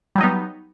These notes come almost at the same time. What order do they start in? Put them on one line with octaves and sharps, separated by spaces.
G3 F#3 D#4 B3